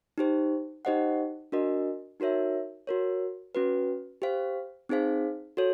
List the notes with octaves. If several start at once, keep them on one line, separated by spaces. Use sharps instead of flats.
D#4 G4 C5
D#4 G4 C5 D#5 F#5
D4 F#4 A#4 D#5
D#4 F#4 A#4 C#5 E5
F#4 A#4 C#5
C#4 F#4 B4
G4 C5 F5
C4 D#4 G#4 C5 F5
F#4 A4 C#5